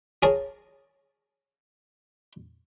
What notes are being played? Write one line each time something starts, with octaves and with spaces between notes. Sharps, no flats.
G#4 A#4 C#5 A5 A#5